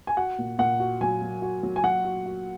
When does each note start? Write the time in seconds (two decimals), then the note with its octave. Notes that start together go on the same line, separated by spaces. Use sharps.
0.07 G#5
0.17 F#4 F#5
0.39 A#2
0.59 A#2 F#5
0.80 F#4
1.01 F#3 G#5
1.22 F#3
1.42 F#4
1.63 F#3
1.76 G#5
1.84 F#3 F#5
2.05 F#4
2.26 F#4